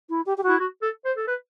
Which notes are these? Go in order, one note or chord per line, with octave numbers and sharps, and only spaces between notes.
E4
G4
G4
F#4
E4
F#4
A4
C5
A4
B4